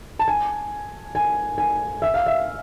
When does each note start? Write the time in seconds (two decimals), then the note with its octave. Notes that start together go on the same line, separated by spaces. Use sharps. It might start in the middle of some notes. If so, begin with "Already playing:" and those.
0.19 A5
0.28 G#5
1.15 G#5
1.58 G#5
2.02 E5
2.14 F5
2.26 E5